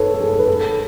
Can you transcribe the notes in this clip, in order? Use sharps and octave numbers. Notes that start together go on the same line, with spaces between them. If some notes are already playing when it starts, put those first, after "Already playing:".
Already playing: A4 B4 C#5
A4
G#4
B4
A4